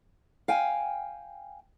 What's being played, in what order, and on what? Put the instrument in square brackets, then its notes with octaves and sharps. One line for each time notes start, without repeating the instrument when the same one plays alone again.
[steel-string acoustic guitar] F5 G5 G#5